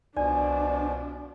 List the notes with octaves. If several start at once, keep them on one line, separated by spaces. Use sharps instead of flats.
C2 B2 F3 D4 D5 G#5